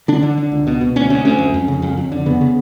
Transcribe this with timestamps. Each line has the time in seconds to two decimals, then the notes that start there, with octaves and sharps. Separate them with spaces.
0.08 D3 D4
0.23 D3
0.38 D3
0.52 C#2
0.67 B2
0.81 B2
0.96 D2 C#4
1.10 D2 C#4
1.25 D2 C#4
1.39 F2
1.54 F2
1.68 C#3
1.82 F2
1.97 F2
2.12 D3
2.26 C#3 B3
2.41 C#3